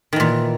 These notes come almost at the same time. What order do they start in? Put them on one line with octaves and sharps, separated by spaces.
D#3 E3 A#2